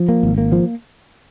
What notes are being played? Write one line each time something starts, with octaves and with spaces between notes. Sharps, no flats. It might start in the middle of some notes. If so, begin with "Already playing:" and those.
Already playing: F3
A#3
G#1
A#3
F3